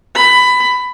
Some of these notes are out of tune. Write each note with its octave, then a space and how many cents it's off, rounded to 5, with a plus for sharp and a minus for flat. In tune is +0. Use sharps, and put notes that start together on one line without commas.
B5 +15